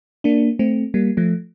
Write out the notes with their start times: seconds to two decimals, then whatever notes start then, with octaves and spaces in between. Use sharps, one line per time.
0.24 A#3 D4
0.59 A3 C4
0.94 G3 A#3
1.17 F3 A3